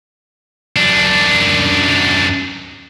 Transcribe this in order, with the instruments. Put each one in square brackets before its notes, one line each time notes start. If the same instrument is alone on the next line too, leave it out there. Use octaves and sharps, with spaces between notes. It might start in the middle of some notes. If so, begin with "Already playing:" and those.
[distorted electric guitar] F#2 D4